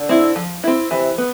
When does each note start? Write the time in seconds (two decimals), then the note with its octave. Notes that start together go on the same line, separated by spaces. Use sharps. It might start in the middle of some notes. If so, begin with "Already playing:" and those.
Already playing: D3
0.09 C4 E4
0.36 F3
0.64 C4 E4
0.91 C3 E3
1.18 B3